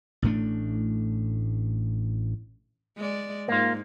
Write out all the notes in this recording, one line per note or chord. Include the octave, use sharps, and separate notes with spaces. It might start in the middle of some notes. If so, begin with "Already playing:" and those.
A1 A2 A3 D4
G#3 D5
G#2 A#3 F4